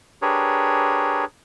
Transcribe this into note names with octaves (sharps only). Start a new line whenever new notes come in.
D4 G4 G#4 A#4 B4 C#5